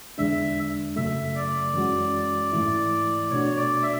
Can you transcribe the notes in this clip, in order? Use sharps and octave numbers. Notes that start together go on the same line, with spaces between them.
E2 D3 G#3 D4 E5
F#2 C#3 F#3 A3 E5
D5
F#2 E3 G#3 C#4 F#4
G#2 E3 A3 E4
B2 A3 D4 F#4 C#5
D5
E5